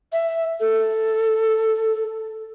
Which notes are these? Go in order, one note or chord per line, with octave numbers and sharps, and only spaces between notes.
E5
A4